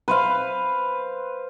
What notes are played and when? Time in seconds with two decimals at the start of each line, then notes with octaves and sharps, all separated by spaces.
0.08 B4 C5 F5